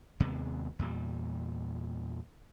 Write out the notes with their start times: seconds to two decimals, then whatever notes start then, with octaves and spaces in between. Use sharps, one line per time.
0.20 D#2 C3 G#3 B3
0.79 E2 A#2 G3